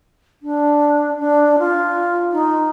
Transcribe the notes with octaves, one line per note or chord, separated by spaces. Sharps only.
D4
D4
F4
D#4